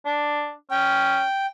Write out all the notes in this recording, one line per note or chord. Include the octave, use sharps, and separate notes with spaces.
D4
C#4 G5